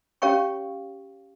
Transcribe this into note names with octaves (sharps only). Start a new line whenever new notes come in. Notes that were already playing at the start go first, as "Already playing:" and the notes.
C#4 G4 C#5 F5 G5 C#6